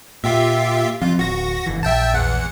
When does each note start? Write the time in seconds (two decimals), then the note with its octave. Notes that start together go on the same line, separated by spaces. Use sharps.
0.24 A#2 F4 G4 E5
1.02 F3 C4 F4
1.19 D1 F#4 A#6
1.66 F#1 E3
1.83 A#1 E5 G5 A5
2.14 E2 F#5